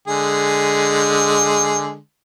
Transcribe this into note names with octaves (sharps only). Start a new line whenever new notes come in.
D3 G#3 G#4